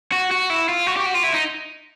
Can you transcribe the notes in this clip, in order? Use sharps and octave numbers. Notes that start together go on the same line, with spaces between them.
F#4
F#4
E4
F4
F#4
G4
F#4
F4
E4
D#4